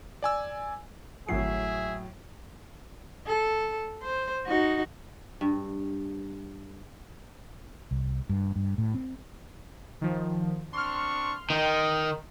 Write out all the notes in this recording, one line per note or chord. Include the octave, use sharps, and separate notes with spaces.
D5 G#5 E6
G#1 A2 F#3 G#4 E5 C7
A4
C5
D#4 F#4
G2
C2
G2
G2
A2
C4
D#3 F3
C4 D4 C6 C#6 F6
D#3 D#5 G5